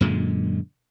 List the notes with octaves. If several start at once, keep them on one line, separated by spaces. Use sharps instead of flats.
F#2 A#2 D3 G#3